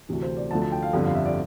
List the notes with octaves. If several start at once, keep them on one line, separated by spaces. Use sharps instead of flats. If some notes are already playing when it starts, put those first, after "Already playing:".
D2 C3 E3
C5
D5
D2 D3 F3 A3 A5
A5
G5
F5
G1 F2 D3 G3
F5
E5
D5